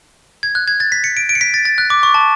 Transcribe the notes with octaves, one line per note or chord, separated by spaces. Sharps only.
G#6
F#6
G#6
A6
B6
C#7
D7
D7
C#7
B6
A6
A6
F#6
D6
C#6
A5